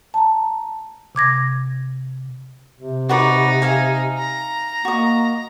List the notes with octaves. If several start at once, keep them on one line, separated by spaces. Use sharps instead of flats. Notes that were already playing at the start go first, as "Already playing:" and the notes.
A5 A#5
C3 D6 G#6 A#6
C3
D#4 F#4 B4 D5
E5 F5 G#5
A#5
A#3 F#4 D#5